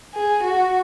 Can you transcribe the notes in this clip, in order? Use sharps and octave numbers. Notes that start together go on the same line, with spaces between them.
G#4
F#4